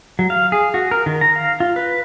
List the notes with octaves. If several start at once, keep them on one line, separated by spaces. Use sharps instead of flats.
F#3
F5
G#4
F#4
A#4
D#3
A#5
F5
F4
B4